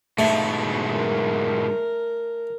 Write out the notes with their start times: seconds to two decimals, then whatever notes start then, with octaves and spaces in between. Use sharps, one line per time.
0.19 G#2 B2 A3
0.93 A#4